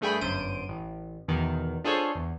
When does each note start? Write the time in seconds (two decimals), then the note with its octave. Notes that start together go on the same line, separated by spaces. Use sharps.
0.01 G2 A3 G#4 G5 B5
0.21 G1 F#2 C5 D7 D#7
0.69 A1
1.28 E2 B2 D#3
1.84 D4 F4 G#4 A4 C5 C#5
2.15 E2